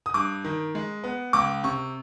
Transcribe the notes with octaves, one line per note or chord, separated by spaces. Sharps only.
D#6
G2 D6
D#3
G#3
B3
C#2 D6
C3 C#6